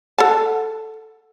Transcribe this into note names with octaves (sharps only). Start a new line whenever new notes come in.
A4 F#5 A5